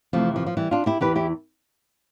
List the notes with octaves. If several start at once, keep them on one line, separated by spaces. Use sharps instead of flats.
F2 C3 E3 F3 A3
F3
F3
E3 G3
D4 F4
E4 G4
E2 C3 E3 G4 B4
E4 G4